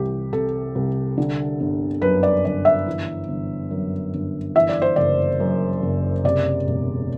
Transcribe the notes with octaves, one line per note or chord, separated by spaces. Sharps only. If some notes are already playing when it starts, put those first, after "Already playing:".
Already playing: C2 E3 G4
C3 A4
C2
D3
G1
F#2 B4
D5
G1 D5
E5
E3
G1
F#2
G1
E3 E5
D5
C5
F#1 D5
F#2
F#1
C3 D5
E1